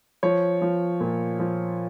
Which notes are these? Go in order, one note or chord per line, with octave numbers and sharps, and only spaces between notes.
F3 C#5
F3
A#2
F3